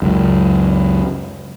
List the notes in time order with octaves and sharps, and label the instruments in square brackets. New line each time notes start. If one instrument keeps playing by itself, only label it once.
[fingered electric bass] C#2 F#2